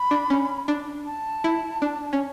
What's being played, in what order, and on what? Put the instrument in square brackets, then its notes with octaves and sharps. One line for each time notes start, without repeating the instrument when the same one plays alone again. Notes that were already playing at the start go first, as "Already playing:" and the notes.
Already playing: [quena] B5
[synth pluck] D4
C#4
D4
[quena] A5
[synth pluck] E4
D4
C#4